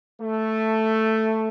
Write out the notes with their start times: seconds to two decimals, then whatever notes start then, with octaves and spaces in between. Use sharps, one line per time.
0.21 A3